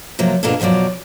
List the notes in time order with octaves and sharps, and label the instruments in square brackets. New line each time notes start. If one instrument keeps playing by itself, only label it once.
[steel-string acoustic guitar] C3 F3 F#3 A#3
B2 A#3 D4 F4 G#4 A4
F2 B2 F3 F#3 D5